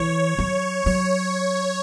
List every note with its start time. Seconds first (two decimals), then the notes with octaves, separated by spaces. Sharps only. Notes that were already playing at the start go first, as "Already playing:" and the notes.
Already playing: E3 C#5
0.39 F#3
0.86 F#3 C#5